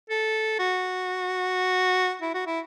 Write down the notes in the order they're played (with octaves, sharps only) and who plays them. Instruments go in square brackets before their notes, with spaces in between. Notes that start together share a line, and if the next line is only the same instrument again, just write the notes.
[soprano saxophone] A4
F#4
E4
F#4
E4